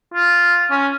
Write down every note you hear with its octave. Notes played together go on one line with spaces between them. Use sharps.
F4
C#4